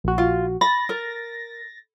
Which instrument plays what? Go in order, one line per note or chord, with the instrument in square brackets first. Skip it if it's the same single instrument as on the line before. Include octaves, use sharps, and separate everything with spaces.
[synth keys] A#1 F#4
[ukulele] F4
[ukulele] B5 [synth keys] A6 A#6
[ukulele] A#4